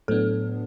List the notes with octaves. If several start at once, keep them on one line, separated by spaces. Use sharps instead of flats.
A2 F#3 B3 D4 A4